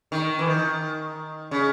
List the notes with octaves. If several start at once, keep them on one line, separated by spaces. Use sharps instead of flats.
D#3
E3
D#3
C#3